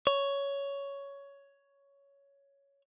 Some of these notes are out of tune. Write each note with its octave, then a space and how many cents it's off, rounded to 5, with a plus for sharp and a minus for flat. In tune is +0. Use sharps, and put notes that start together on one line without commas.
C#5 +10